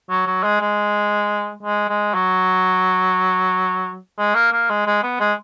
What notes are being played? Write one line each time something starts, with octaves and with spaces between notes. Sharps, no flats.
F#3
F#3
G#3
G#3
G#3
G#3
F#3
G#3
A#3
A#3
G#3
G#3
B3
G#3